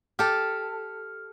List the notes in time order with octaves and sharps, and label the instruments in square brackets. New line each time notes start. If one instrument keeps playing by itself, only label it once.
[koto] G4 A4 [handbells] F6